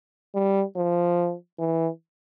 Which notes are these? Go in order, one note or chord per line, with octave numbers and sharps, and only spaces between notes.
G3
F3
E3